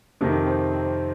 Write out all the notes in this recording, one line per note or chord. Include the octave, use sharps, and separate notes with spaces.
F2 C3 D#3 A#3
C4
C4